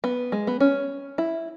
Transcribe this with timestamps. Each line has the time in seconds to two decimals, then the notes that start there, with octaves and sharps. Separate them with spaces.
0.04 B3
0.32 G#3
0.47 B3
0.60 C#4
1.18 E4